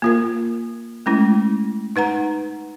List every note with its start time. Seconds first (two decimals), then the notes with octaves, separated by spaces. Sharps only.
0.02 A#3 F4 A#4
1.06 G#3 A3 C#4 E4
1.96 D#4 B4 F#5 A#5